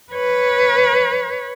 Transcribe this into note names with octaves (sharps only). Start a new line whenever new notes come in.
B4 C#5